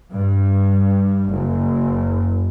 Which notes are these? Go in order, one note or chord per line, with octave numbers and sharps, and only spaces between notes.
G2
F#1